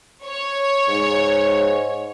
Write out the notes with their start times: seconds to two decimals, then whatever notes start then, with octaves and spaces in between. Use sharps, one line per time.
0.24 C#5
0.89 G#2